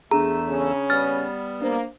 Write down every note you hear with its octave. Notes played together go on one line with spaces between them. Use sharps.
E2 A3 D4 G#4 A#5 E6
C#3 C#4
G3 B3 F6 A6
A#3 D4 C5